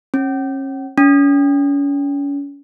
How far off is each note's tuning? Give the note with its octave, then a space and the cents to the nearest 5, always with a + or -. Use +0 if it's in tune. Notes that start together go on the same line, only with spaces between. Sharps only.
C#4 -35
C#4 +35